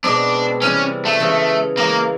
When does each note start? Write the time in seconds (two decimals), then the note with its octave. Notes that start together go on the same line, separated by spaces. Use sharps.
0.04 B2 G#3 C4 D4
0.62 C3 E3 G3 C#4
1.05 A3
1.20 C#3 E3 G#3
1.77 E3 G#3 A#3 C#4